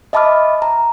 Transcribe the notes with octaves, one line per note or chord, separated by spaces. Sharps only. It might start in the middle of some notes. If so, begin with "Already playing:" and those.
D#5 E5 A5 B5 D6 F6
A#5